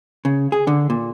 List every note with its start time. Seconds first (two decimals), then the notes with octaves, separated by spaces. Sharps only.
0.25 C#3
0.52 G#4
0.67 D3
0.90 A#2